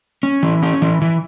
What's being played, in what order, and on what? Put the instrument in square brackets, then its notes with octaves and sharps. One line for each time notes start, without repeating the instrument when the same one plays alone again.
[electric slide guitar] C#4
E3
C#4
E3
E3